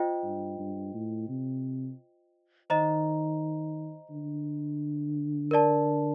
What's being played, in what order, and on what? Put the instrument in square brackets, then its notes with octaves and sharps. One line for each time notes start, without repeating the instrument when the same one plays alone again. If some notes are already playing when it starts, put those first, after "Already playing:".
Already playing: [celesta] F4 C5 D#5 G5
[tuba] G2
G2
A2
C3
[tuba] D#3 [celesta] C5 D#5 A#5
[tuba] D3
[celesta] A#4 D5 A5